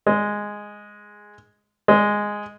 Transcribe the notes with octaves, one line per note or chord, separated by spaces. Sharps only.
G#3
G#3